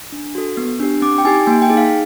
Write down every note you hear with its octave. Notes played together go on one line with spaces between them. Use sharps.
D4
F#4 A4
B3
D4 G4
C4 D6
G5
D#4 G4 G#5
A#3 G#5
G5
D#4 G#4
F5